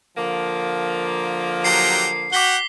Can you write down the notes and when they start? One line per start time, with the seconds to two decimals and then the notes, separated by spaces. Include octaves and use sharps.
0.17 D3 F3 A#3
1.64 F#3 G4 A#5 C7
2.33 F#4 F#5 G5 D6 B6 G7